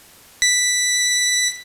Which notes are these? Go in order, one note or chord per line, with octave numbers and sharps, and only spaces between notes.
B6